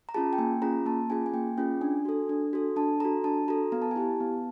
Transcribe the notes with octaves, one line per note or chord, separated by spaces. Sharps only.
A#5
C#4 F4 G#4 A5
G5
A#3 G#5
C#4 F4 G#4 A#5
A#3 A5
C#4 F4 G#4 G#5
G#5
A#3 G5
C#4 F4 G#4 G5
D4 G#5
F#4 A4
D4
F#4 A4
D4 A5
F#4 A4 A#5
D4 A5
F#4 A4 A#5
B3 A#5
A5
G#5
E4 G4 A5
B3